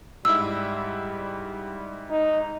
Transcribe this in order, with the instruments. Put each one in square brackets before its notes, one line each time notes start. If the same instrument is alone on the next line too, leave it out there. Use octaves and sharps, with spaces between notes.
[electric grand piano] G#2 E4 E5 [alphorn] G3 [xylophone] E6
[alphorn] D#4